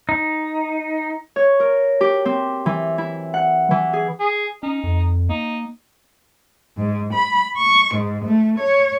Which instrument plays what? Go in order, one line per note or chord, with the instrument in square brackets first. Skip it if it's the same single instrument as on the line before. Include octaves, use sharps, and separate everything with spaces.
[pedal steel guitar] D#4
[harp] C#5
A#4
G4
C4
E3
E4
F#5
E3
G#4
[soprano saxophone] G#4
[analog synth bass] C#4 [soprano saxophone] D#4
[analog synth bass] F2
[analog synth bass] A#3 [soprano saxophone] D#4
[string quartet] G#2
B5
C#6
G#2
A3
C#5